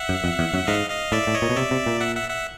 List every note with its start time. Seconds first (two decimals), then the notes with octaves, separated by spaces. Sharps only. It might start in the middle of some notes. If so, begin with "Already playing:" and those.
Already playing: E5 F#5
0.09 F#2
0.24 F2
0.39 E2
0.53 F#2
0.67 G#2 D#5 F5
0.90 D#5 F5
1.12 A2 D5 E5
1.27 A2
1.34 C#5 D#5
1.42 A#2
1.49 B2
1.56 C3 D5 E5
1.71 C3
1.86 A#2
2.00 E5 F#5
2.16 E5 F#5
2.30 E5 F#5